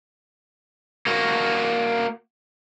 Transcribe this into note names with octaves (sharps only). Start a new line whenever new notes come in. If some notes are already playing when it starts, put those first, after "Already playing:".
A#3 F#4